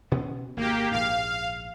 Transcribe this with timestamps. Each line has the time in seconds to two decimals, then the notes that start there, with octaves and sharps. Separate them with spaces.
0.12 B2 B3 C#4
0.57 G#1 A#3 G4
0.91 A#1 G#2 F5